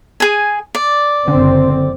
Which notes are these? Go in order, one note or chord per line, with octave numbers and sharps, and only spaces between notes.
G#4 G#5
D5
F#1 D3 C4